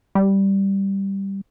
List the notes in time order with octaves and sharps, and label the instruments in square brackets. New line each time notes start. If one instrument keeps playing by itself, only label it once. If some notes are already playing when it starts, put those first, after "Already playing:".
[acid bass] G3